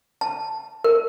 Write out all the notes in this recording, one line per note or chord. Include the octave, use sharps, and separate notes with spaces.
A5
A#4